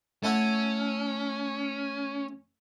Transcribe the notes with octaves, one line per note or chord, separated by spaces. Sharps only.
A3 C#4 E4 F#5